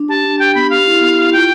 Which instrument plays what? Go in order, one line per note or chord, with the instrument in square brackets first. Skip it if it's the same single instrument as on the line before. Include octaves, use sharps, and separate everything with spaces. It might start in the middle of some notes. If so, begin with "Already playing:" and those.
Already playing: [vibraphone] D4
[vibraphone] G4 [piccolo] A5
[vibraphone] D4
[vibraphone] G4 [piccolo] G5
[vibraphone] B3 [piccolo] B5
[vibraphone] G4 [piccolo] F5
[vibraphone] E4
B3
E4
[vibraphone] F4 [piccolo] G5